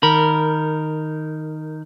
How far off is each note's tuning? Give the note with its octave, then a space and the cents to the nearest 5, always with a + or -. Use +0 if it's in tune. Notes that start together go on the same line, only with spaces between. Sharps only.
D#3 +0 A#4 -15 B5 -15